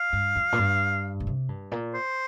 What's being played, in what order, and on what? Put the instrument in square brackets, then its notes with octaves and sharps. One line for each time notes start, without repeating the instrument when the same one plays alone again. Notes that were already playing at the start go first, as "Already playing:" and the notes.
Already playing: [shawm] F5
[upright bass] G2
F2
A#2
G2
A#2
C3
G2
A#2
[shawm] C5